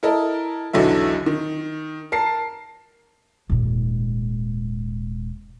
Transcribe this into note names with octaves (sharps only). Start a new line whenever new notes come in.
E4 A4 A#4 D#5
B1 E2 D3 F#3 E5
D#3
A#4 A5 C7
D#1 G#2